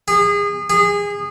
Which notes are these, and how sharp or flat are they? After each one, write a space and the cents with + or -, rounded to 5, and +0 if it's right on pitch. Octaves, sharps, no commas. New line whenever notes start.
G#4 -30
G#4 -25